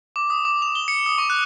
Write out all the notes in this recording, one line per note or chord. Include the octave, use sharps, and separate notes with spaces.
D6
D#6
D6
F7
G7
C#7
D#6
C#6
F#6